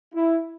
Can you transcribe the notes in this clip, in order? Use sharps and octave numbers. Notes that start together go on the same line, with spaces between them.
E4